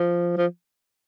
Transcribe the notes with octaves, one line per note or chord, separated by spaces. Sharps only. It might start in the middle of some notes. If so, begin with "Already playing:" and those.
Already playing: F3
F3